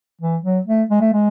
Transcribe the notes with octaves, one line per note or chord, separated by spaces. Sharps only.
E3
F#3
A3
G#3
A3
G#3